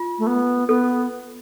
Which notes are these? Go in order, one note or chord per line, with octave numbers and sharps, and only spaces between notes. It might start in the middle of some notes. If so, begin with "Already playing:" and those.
Already playing: F4
A3
B3
B3 A4